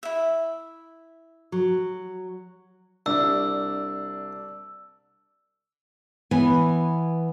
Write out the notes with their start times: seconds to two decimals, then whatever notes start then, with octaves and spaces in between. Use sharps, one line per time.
0.03 E4 E5
1.52 F#3
3.06 C2 D4 E6
6.31 E3 B3 C#5 G#5